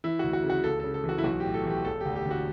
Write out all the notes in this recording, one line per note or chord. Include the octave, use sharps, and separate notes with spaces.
E3 E4
D2 F#4
F#4
C#3
F#4
C#2 A4
C#3 A4
A4
E3
F#4
E4
B1 F#4
A2 G4
A4
E3 G4
E1 A4
D2 G4
G4
D3 F#4